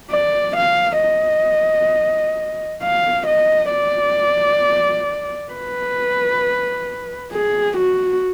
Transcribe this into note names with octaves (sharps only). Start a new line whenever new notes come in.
D5
F5
D#5
F5
D#5
D5
B4
G#4
F#4